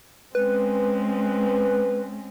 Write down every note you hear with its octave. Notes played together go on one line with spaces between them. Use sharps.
G#3 C4 C#4 B4